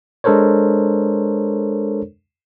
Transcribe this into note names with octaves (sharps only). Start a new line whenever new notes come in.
G#3 D4 A4 A#4 C5 C#5